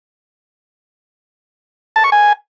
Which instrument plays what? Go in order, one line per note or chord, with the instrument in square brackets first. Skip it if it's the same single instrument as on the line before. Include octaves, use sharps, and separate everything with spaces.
[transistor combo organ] A5
C#6
G#5